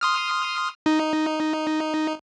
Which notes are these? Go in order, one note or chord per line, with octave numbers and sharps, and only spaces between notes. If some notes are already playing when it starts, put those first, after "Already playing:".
C6 D#6 F6
D#4